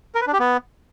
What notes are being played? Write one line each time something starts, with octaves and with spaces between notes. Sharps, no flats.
A#4
B4
D4
G4
B3